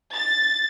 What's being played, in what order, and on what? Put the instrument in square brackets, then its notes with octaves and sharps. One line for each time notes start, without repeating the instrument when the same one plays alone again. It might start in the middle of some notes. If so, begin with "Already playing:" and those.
[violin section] A6